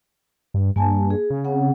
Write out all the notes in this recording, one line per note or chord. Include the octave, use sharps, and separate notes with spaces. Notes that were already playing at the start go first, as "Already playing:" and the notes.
G2
G2 A#3 G#5 A5
G#4
C#3
C4 F#5